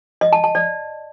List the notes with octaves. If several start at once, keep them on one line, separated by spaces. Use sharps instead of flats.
D#5
A5
A5
D5